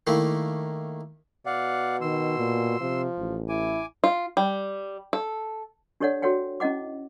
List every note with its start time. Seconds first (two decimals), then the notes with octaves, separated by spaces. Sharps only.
0.07 D#3 A3 A#3 E4
1.46 B2 D5 F5 F#5
2.01 D#3 C6 E6
2.39 A#2
2.81 C3 F3
3.18 A1
3.49 E4 G#5 D6
4.04 F4
4.37 G3
5.13 A4
6.00 D4 G4 A4 C#5 D5 F#5
6.22 F#4 A4 C#5 F#5 G5
6.60 C#4 E4 D#5 F#5 D6